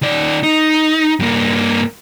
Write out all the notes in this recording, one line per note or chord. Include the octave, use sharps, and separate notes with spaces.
D#3 D5
D#4
G2 A#3